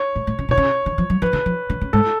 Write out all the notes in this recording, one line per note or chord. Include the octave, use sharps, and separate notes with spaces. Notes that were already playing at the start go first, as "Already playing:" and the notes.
Already playing: C#5
A2
A2
C#3
B2 C#5
C#3
D3
F3
F#3
F3 B4
D3
F3
D3
C#3
G#2 A4